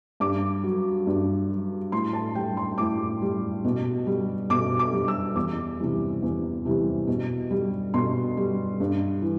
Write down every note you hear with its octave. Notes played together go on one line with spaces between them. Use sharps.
G2 D6
F#3
G2
F#3
A2 C6
A5
G3 G5
C6
A2 D6
G3
B2
G3
B2 D6
D6
G3
E6
E2 D6
C3 E3 G3
E2
C3 E3 G3
B2
G3
B2 C6
G3
G2
E3